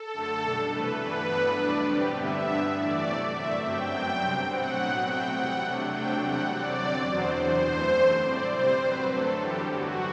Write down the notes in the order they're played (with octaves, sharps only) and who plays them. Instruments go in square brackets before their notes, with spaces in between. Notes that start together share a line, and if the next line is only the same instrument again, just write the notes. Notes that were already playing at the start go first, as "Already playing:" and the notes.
Already playing: [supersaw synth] A4
F#2 D3 A3
B2 G3 D4
C3 E3 A3 B4
G2 E3 B3 D4 B4
G2 F#3 B3 D4
E2 B2 A3 D4 D5
D3 G3 C4 G4
G2 D3 G3 B3 E5
G2 E3 B3 D4
A2 E3 A3 D5
C3 F#3 A3
F#2 D3 A3 E5
G2 F#3 C4 G5
F#2 F#3 B3 D4
C3 G3 C4
B2 F#3 A3 C4 F#5
A2 F#3 B3
B2 A3 C4 G5
E2 C3 G3 F#5
C3 F#3 A3 D4
C3 F#3 A3 D4 G5
E2 C3 G3 F#5
F#2 F#3 C4 D5
E2 D3 F#3 C4
E2 B2 F#3 B3 D4 C5
E2 C3 E3 C5
F#2 E3 A3
E2 D3 A3 C4
A2 G3 C4 D5
C3 G3 C4 C5
F#2 F#3 C4 B4
D3 F#3 A3 A4
G2 E3 G3 D4 G4
E2 D3 F#3 B3 F#4